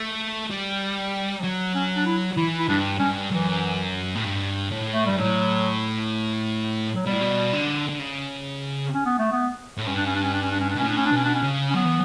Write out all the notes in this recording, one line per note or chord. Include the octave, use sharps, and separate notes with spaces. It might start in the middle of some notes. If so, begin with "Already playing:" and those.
Already playing: A3
G3
F#3
C#4
D4
E4
E3 E4
E4
G2 D4
G2 C#4
F#2 E3
A2
G2
A2
A3
G2 G3
A2 F#3
F#3
B2 G3
A2
B2
D3
D3
C#3
C#4
B3
A3
B3
A2
G2 C#4
D4
C#4
D4
C#4
D4
C#4
D4
C#4
D4
B2
A2 C#4
D4
C#4
D4
B2 C#4
D4
C#4
C#3
C#4
F#3 B3
E3